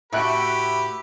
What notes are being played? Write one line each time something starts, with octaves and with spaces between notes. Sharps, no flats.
A2 F#4 G4 B4 E5 F#6 D7